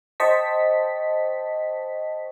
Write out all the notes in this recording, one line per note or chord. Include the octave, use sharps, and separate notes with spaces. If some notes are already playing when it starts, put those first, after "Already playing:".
C5 D#5 G5 A5 C#6 B6